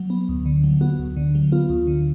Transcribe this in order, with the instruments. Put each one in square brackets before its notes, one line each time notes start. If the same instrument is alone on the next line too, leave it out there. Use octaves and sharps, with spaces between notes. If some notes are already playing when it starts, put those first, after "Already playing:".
Already playing: [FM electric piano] F#3
B3
D2
D3
F#3
B3 F#4
D2
D3
F#3
B3 F4
D2
D3